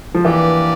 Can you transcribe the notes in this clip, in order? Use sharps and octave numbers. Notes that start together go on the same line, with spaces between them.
F3
E3 A#3 D4 G4 B4 D5